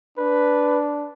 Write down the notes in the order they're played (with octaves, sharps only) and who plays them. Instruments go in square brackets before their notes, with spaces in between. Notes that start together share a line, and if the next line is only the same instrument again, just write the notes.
[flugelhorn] D4 [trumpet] B4